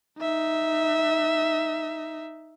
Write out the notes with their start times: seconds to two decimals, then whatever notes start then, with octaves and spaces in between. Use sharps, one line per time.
0.19 D#4 E5